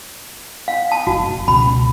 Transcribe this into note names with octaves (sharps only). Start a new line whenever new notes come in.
F5
A5
F#1 F#4
F#1
C#2 B2 B5